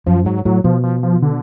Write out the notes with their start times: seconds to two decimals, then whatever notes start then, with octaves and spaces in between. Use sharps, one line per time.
0.06 F#2 F3
0.25 G#2 F#3
0.45 A2 F#3
0.64 B2 F3
0.83 F3
1.03 F3
1.22 D3